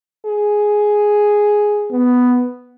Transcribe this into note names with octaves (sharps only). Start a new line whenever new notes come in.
G#4
B3